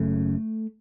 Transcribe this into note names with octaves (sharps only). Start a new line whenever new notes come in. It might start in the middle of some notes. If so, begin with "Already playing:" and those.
Already playing: F#1 F#2 C#3 A3